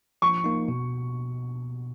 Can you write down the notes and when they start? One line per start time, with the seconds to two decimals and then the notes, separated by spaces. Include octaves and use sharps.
0.22 F3 C#6
0.44 A#3 D#4
0.68 B2